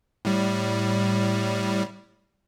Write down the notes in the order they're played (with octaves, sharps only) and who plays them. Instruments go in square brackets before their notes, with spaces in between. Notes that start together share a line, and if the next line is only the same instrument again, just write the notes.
[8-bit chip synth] A2 G3